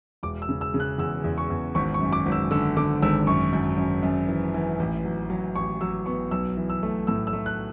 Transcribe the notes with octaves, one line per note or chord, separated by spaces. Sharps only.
E1 D6
E6
C#3
E6
C#3
F#6
E2 E6
E2
C#6
E2
G#1 C#6
C#6
F#2
D6
G#1
E6
D3 E6
D3 D6
G#1 E6
F#2 C#6
F#2
F#2
F#2
E3
E3
A1
F#3
F#3
A1 C#6
F#3 E6
B3 C#6
B1 E6
E3
E6
A3
A2 E6
E6
A3
F#6